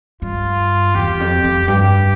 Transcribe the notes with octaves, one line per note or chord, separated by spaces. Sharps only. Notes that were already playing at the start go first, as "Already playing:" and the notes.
G2 F4
E2 G4
F2
F2
G2 G4